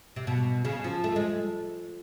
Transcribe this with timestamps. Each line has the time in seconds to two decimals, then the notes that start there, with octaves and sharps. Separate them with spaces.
0.16 C3
0.27 B2
0.65 C#3
0.84 F3
1.04 A3
1.16 G#3